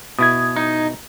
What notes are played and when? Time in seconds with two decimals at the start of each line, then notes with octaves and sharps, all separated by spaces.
0.19 B2 E4 D#6 G#6
0.56 D#4